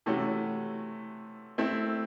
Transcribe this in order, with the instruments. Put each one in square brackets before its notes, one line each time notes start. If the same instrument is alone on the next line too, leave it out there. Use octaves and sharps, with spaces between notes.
[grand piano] C3 E3 A3 C#4 F#4
A3 C4 E4